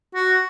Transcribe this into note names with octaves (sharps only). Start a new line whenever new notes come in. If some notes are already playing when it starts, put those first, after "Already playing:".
F#4